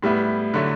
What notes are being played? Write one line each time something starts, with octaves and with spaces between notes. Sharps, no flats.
A2 G3 B3 E4
D3 F#3 A3 E4